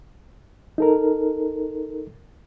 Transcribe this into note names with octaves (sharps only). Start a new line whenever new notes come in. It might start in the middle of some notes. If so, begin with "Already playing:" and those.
D#4 A4 A#4